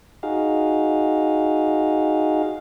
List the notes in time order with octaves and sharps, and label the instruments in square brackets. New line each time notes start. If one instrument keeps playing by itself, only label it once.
[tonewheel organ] D#4 F#4 G#4 F5